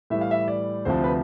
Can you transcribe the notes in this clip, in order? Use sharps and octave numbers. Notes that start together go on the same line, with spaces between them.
A2 E3 G3 E5
F5
E5
D5
D2 C3 F3 C5
B4